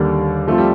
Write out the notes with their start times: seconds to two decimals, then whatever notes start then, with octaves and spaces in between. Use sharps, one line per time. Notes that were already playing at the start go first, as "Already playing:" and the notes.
Already playing: D#2 D3 G3 A#3
0.48 F3 A3 C4 F4
0.58 G3